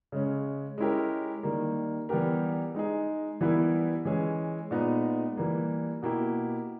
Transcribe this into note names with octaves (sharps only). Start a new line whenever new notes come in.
C#3 G#3 C#4
G#3 C#4 E4 G4 A#4
D#3 G3 A#3
E3 G3 B3 G4 A#4
G#3 D#4 G#4
E3 G3 B3 E4 A#4
E3 G#3 C#4 G#4
A#2 G#3 B3 D#4
E3 G3 A#3
B2 A#3 E4 G4